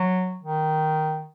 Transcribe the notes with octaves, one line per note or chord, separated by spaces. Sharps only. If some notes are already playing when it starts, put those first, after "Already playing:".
Already playing: F#3
D#3